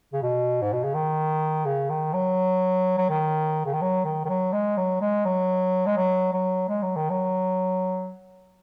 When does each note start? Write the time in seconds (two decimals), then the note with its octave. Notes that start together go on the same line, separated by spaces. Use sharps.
0.13 C#3
0.22 B2
0.62 G#2
0.73 B2
0.84 C#3
0.95 D#3
1.66 C#3
1.90 D#3
2.13 F#3
2.98 F#3
3.10 D#3
3.66 C#3
3.74 D#3
3.82 F#3
4.05 D#3
4.25 D#3
4.29 F#3
4.53 G#3
4.77 F#3
5.01 G#3
5.25 F#3
5.86 G#3
5.97 F#3
6.33 F#3
6.69 G#3
6.82 F#3
6.96 D#3
7.10 F#3